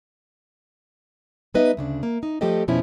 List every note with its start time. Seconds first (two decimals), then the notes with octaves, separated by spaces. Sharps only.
1.54 G3 B3 D#4 B4 D#5 E5
1.77 D2 C#3 D4
2.03 A#3
2.23 D#4
2.41 F3 G3 A3 G4 A4 D#5
2.68 F2 B2 F3 C#4 E4